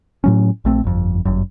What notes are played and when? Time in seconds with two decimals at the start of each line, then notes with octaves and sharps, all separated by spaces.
0.24 A2 F#3 C#4
0.65 A#1 A3 C4
0.84 G1 F2
1.25 G1 F#2